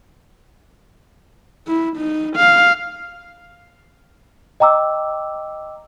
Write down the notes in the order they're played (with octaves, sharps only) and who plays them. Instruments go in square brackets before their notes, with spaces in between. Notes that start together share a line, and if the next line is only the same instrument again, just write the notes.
[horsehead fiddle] E4
D#4
F5
[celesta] D#5 G5 A#5 D6 E6